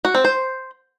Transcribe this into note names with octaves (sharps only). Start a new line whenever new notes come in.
F#4
C4
C5